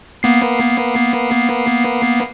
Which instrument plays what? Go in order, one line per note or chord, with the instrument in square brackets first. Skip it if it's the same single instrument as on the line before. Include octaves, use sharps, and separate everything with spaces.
[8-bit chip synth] A#3 B3 C7